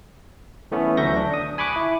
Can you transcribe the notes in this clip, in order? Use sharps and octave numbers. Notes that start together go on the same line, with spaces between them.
E3 A3 B3 C#4
D2 F#3 E5 C#6 G6 A#6
D4
D#6
G#5 B5 C#6 D6 F#6
E4